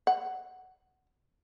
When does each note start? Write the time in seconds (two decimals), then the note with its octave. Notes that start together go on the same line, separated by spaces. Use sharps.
0.07 F#5